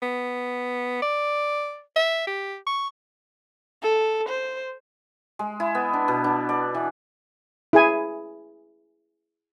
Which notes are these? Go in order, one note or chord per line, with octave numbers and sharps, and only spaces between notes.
B3
D5
E5
G4
C#6
A4
C5
G#3
E4
B3
D4
B2
D4
D5
E3
E4 G#4 G#5